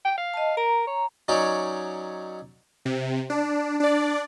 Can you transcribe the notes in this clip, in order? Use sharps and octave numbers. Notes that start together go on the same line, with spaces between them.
G5
F5
D#5 A5
A#4 A#5
C#5
F#3 C#4 D#4 C#5 D5
C3
D4
D4 D5